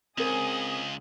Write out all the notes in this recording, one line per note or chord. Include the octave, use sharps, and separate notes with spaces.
C#2 C4 G#4 A#4 D#6